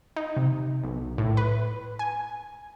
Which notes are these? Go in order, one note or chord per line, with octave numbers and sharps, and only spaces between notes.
D#4
C3
B1
A2
B4
G#5